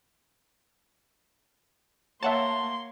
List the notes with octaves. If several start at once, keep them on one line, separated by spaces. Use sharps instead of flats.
A#3 C#5 E5 F#5 A5 C6